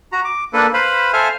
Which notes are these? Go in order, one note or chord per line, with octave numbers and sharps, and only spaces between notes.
F#4 A#5
D6
A#3 D4 A4 B4
B4 C5 F5 B5
A4 C5 E5 F5 G#5 F6